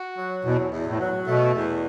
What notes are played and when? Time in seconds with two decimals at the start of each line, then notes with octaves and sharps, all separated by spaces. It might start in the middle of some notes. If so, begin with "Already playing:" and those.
Already playing: F#4
0.17 F#3
0.45 E2 B2
0.72 E2
0.86 A2
1.00 F#3
1.27 B2 A3
1.55 E2